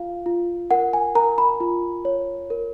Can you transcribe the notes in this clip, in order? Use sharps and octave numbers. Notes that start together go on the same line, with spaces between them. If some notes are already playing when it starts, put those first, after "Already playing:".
Already playing: F4 F5
F4
A#4 F#5
G#5
A#4 A#5
B5
F4
C#5
A#4